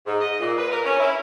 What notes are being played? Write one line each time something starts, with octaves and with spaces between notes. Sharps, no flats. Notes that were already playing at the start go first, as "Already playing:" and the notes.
G#2
D#5
A#2
B4
A#4
C#4
E4